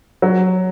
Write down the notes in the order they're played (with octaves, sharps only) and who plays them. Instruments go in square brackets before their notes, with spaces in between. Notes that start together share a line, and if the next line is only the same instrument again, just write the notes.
[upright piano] F#3